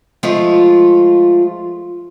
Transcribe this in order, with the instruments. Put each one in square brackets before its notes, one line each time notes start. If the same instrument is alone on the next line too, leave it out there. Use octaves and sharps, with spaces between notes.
[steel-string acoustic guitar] F3 G#3 A3 F4